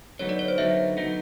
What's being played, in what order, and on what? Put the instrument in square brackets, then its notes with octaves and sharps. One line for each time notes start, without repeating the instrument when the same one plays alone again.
[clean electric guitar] D3 F#3 B3 D#4 [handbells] C#5
[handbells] D5
C#5
C5
[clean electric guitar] D3 F#3 B3 D#4 [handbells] E5
[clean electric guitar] D3 F#3 B3 D#4